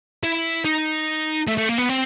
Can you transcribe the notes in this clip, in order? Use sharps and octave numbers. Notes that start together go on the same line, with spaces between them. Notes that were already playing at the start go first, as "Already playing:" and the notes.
E4
D#4
A3
A3
A#3
B3
C4